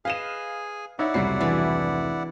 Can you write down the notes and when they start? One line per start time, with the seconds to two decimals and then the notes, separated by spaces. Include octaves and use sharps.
0.05 G#4 B4 D#5 F5 G#5 E7
0.99 D#4 E4 C#5 D5 E5 F#5
1.14 F1 C#2 F#3 G3 F#4 B5 C7
1.41 E3 G#3 D4